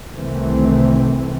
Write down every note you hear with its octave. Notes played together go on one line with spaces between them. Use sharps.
C2 D#3 E3 A3 C4